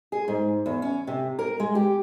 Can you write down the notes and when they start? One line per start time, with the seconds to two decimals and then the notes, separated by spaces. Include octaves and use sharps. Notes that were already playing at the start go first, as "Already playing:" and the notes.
0.12 G#4
0.28 G#2
0.66 E2
0.82 C#4
1.07 C3
1.39 A#4
1.60 G#3
1.75 G4